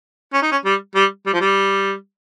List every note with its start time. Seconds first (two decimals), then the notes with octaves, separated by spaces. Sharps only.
0.34 C#4
0.42 D#4
0.52 C#4
0.65 G3
0.95 G3
1.26 G3
1.33 F3
1.41 G3